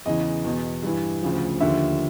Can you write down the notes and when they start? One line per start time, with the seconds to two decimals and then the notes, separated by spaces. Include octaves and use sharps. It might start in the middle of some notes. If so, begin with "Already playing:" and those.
0.06 E2 C#3 E3 D#5
0.44 E2 B2
0.83 G2 E3
1.22 D2 C#3 F3
1.60 D#2 D3 F3 E5